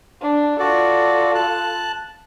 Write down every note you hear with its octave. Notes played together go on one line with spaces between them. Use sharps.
D4
F4 F#4 A4 D5
A5 F#6